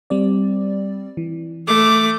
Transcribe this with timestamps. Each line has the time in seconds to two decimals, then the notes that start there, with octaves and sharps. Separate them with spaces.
0.10 G3 C4 D5
1.17 E3
1.67 A3 D6